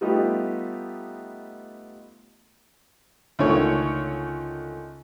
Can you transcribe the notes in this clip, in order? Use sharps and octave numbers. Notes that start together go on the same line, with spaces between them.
G3 A3 B3 D#4 F4 G4
C#2 D3 D#3 A3 C#5